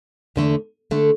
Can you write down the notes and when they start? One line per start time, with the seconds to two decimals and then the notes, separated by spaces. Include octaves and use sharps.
0.36 E2 D3 A3
0.91 D3 A3